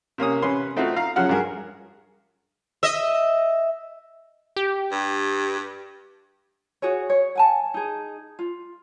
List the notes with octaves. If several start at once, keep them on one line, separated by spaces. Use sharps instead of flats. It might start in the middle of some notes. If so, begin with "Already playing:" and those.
C3 A#3 C#4 D#6
C3 C#4 B4 C6
A3 C4 D#4 F4 F#4
F5 A#5
C#3 F3 F#3 F#5 F6
G2 F#4 G#4 A#4
D#5 E5
G4
G2
F#4 G#4 C#5
C#5
F#5 G#5 A5
D#4 G#4
F4